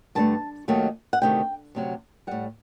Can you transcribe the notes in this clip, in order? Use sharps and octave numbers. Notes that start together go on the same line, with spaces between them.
G2 D3 A3 A5
D#2 D#3 F#3 A3
F#5
D2 C3 D#3 A3 G5
D2 C3 F#3
A2 G3 F#5